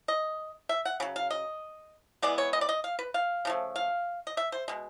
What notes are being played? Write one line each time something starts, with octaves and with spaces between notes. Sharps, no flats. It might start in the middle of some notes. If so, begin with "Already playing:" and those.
D#5
E5
F#5
C#3 F#3
F5
D#5
E3 G#3 B3 D5
C#5
D#5
D5
D#5
F5
B4
F5
C#3 F3 A3
F5
D#5
E5
C5
B2 G#3